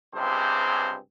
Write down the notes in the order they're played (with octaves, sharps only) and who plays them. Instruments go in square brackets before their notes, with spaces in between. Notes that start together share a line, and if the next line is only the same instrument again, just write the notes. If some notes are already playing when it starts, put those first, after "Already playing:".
[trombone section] C#2 G2 C3 C4 G#4 C5